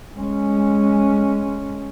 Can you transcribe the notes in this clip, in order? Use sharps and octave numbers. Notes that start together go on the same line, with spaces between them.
G#3 C#4